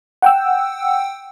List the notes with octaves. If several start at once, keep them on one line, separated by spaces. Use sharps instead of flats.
F#5 G5 E6